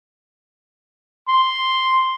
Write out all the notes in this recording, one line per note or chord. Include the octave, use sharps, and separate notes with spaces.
C6